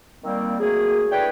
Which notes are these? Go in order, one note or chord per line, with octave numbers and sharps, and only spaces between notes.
D#3 G3 A#3 C4
D#3 F#3 A3 A#3 G#4
A3 D4 E4 B4 C#5 G5